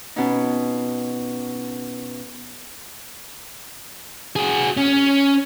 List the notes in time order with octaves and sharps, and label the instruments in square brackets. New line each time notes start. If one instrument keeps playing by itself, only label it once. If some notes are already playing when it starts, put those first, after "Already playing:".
[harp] B2 C#4 D#4
[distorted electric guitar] F#4 G#4
C#4